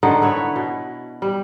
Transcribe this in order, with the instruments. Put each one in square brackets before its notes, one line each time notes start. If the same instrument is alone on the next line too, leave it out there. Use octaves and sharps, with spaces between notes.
[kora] D3 D#3 B3 D#4
E4 B4 C#5 E5
B2
G3